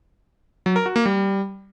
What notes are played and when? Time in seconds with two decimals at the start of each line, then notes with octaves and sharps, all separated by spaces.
0.66 F#3
0.76 A#4
0.86 F#4
0.96 A#3
1.06 G3